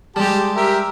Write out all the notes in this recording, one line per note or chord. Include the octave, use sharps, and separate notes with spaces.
G3 G#3 G4 A5
G4 A#4 E5